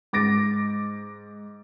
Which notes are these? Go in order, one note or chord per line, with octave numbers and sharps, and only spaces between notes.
G#2 D6 A6 A#6 D7